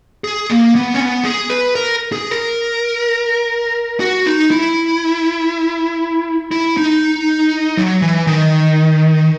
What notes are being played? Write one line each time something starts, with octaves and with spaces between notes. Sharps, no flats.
G#4
A#3
B3
C#4
B3
G#4
B4
A#4
G#4
A#4
F#4
D#4
E4
E4
D#4
F#3
E3
D#3